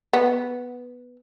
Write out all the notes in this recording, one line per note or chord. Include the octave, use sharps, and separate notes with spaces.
B3